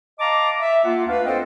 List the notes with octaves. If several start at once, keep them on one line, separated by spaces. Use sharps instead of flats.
D#5 F5 A5 A#5 D6
E5
A#3 F4 F#5
D2 A3 D4 B4 F5
C4 F4 A4 C5 D#5 G5